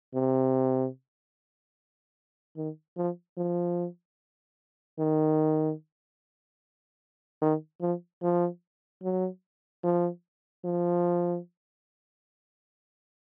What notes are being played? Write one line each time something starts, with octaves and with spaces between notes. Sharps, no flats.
C3
D#3
F3
F3
D#3
D#3
F3
F3
F#3
F3
F3